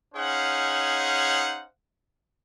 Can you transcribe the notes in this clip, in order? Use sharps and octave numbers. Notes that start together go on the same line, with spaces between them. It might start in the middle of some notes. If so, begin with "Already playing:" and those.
C#4 D#4 G#4 C5 F5 F#5